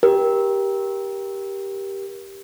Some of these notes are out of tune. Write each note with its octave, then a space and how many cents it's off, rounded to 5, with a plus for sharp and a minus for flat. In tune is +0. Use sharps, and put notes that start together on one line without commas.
G4 +0 A#4 +20